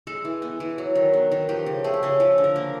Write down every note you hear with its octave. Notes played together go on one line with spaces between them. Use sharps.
G#3 A4
E3
B3
E3
F#3
D#3
B3
D#3
F3 G4
C#3
A3 G#4
G4
C#3 G#4
F3 A4
D3
A#4
A#3